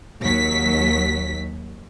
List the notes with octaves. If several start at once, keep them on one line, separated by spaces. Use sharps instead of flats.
D#2 F#3 B6